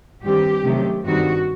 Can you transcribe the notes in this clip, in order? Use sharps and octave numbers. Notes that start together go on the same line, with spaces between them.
G2 D#3 G3 C4 G4
C3 D#3 F#3 A3 C#4
G2 D#3 G3 C4 D#4 F#4